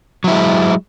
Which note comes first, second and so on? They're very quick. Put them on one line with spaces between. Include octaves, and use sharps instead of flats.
F#3 E4 G#3